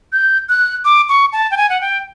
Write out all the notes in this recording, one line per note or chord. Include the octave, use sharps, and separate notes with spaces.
G6
F#6
D6
C#6
A5
G5
G#5
F#5
G5